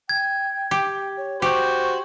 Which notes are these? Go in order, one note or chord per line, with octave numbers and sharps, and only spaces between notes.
G5 G#6
G4
C#5
F#4 G4 C5 C#6